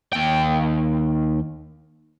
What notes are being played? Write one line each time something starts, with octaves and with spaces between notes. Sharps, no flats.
D#2 G5